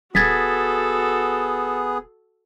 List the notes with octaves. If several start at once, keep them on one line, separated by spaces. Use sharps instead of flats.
D#1 B3 F#4 G#4 A4 G#6 A6 B6